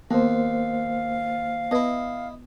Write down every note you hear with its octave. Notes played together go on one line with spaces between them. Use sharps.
D#2 A#3 B3 C5 F5
B3 E4 B4 D#5